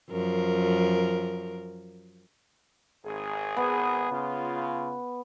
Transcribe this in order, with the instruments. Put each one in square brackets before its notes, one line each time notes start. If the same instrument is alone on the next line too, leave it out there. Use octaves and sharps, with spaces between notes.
[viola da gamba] F#2 F3 A#4
[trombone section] G#1 G#4
[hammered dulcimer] B3
[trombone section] C#3 F4